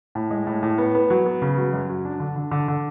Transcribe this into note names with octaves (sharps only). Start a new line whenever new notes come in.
A2
G#3
A2
A2
B3
B3
F#3
B3
C#3
F#3
F#2
F#3
D4
D3
D3
D3
D3